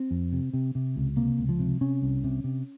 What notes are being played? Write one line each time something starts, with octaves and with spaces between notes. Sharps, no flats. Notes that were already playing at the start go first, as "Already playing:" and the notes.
Already playing: C4
F2
C3
C3
C3
C#2
C3 A#3
C#2
F3
C3
C3 C#4
C2
C3
C3